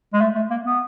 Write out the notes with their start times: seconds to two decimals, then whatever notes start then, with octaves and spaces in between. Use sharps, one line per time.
0.13 G#3
0.21 A3
0.35 A3
0.51 A#3
0.65 B3